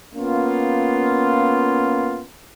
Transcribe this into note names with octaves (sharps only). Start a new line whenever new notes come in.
A#3 B3 C#4 F4